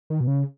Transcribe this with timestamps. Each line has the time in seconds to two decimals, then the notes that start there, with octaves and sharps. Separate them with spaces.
0.10 D#3
0.20 B2
0.27 C#3